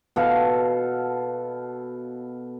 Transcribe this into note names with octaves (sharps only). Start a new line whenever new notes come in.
B2 A4 F5